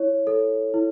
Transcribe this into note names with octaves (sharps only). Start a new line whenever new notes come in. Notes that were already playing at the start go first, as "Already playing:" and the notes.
Already playing: E4 C#5
A4
E4